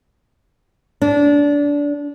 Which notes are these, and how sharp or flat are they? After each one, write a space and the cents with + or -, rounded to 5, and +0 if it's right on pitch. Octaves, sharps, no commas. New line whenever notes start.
D4 -20